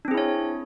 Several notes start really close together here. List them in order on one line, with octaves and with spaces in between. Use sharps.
D4 C4 G#4 E4 C#5